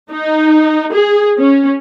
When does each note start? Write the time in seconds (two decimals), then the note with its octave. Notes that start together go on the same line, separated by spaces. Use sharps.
0.11 D#4
0.92 G#4
1.38 C#4